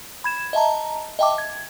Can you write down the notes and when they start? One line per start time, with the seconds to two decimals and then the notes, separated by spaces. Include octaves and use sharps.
0.24 B5 G#6 E7
0.53 D#5 E5 A5 A#5
1.19 D#5 E5 G5 A5 D6
1.38 G#6